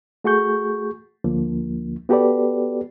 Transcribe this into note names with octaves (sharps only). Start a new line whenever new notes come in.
A3 F#4 G#4 C#6 G6
D2 D3 F3 A#3
B3 F#4 G4 A4 B4 D5